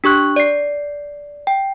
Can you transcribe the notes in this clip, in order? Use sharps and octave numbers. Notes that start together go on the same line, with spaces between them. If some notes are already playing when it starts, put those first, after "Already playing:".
D4 G4 C#6 F#6
D5 C7
G5